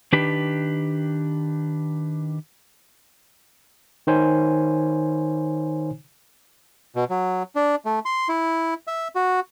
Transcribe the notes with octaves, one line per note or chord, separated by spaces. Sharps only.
D#3 D4 G4 B4
D#3 D#4 C5 C#5 G#5
B2
F#3
D4
A3
C6
E4
E5
F#4